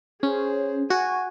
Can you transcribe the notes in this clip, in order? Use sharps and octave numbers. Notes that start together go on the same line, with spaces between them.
C#4 G#4 C5
F#4 G#5